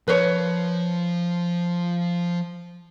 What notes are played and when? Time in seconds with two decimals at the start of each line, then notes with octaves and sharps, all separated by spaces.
0.08 F3 B4 C#5 C6